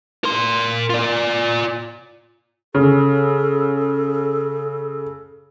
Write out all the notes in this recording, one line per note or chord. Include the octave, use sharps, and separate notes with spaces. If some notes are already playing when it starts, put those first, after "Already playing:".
A#4 C6
F4 D5
C#3 A4